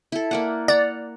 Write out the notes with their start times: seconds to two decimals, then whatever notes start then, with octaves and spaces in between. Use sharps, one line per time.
0.12 E4 A4
0.31 A#3 D5 F#5
0.68 D5 F#5 A#5